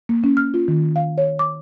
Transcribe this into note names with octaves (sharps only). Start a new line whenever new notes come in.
A#3
C#4
F6
F4
D#3
F5
C#5
D6